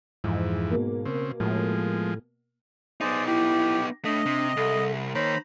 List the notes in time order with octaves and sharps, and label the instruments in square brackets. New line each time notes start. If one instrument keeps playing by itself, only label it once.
[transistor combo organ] F2 E3 [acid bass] G#2
[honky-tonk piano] B2 A#3
[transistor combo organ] C#3 C4
[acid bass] A2 [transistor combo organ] F3 G#3
[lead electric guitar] B3 D#4 [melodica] G#4 C5 D5
[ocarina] E4 [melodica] G4
[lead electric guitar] A2 A3 [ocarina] D4 [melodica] D#5
[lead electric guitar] C3
[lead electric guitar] C2 [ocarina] A4
[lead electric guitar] D#3 A#3 [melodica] C5 A#5 B5 [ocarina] C#5